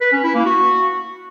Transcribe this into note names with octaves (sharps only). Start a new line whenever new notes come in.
B4
C#4
E4
A#3
F#4